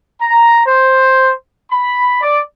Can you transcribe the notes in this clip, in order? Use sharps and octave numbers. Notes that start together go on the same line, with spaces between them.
A#5
C5
B5
D5